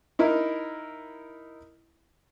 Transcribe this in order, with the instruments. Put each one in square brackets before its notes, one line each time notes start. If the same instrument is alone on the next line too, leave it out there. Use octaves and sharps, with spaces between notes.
[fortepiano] D#4 E4 A#4